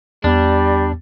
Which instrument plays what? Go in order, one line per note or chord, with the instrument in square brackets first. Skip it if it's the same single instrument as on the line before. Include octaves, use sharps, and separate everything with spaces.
[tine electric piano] E2 B3 [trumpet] G3 [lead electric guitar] D4